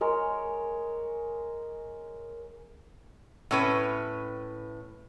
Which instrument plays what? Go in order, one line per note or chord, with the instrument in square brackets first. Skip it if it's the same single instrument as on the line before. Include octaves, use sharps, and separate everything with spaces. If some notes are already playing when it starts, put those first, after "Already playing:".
[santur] G#3 A#4 C#5
[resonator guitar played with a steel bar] A2 C#4 B4